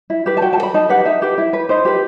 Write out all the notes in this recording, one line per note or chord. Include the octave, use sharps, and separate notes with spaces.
E4
G4 B4
A5
F#4 G5
A5
A4
B5
D#4 A5
G4 B4 F#5
D#4 E5
G4 B4
E4
B4
D#4 C5
G4 B4